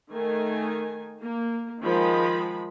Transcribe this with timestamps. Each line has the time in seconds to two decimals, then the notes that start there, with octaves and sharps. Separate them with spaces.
0.11 D#3 A3 G#5
1.22 A#3
1.82 D#3 F3 G#3 B5